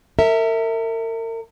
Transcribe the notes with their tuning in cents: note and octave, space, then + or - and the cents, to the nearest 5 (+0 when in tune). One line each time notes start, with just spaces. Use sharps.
A#4 -40 E5 -15